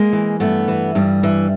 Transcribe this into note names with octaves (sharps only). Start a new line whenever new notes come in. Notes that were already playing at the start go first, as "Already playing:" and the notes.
Already playing: G#3 A#3
E3
G2 A3 B3
E3
G2 G3
E3